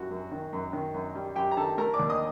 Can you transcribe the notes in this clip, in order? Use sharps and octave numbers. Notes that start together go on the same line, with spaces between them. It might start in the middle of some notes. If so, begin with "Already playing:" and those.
Already playing: F#2 G3 F#4
F#2
D#3
F#2
D#3
F#2
G3
F#2 G4 G5
A#5
D#3 A4 A5
A3 A#4 A#5
D5 D6
D#2
D#5 D#6